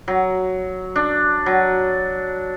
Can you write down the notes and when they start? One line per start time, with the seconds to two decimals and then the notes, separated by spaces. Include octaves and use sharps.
0.08 F#3
0.96 D4
1.46 F#3